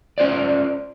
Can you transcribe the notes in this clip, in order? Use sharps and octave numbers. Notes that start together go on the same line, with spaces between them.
C#4 F4 C5 D5